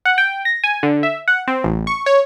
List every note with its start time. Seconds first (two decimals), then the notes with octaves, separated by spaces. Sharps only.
0.05 F#5
0.18 G5
0.45 A#6
0.64 G#5
0.83 D3
1.03 E5
1.28 F#5
1.48 C4
1.64 A1
1.87 C#6
2.06 C#5